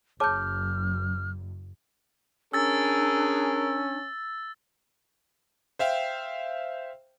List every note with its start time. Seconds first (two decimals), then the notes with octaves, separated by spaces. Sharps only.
0.20 F#1 F#2 G#4 C#5 A5 D6 F6 G6
2.53 C#4 D4 G#4 A#4 E6 A6
5.79 C5 E5 F5 G5